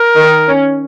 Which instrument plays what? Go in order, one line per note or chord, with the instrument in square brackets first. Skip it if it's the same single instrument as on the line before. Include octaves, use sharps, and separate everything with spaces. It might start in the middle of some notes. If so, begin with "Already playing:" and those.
Already playing: [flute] A#4
[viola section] D#3 D#4
C#4